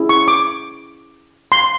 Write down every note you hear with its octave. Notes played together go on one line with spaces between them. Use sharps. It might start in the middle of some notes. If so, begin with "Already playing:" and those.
Already playing: C#4 E4 G#4
C#6
D6
C6